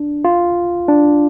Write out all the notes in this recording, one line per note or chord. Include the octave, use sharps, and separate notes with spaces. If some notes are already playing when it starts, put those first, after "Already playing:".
Already playing: D4
F4
D4